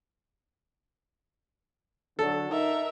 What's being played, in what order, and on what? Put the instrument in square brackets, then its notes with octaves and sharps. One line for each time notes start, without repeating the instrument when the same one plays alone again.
[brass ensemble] D3 F#3 [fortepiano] A4
[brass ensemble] D#4 [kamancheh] A#4 E5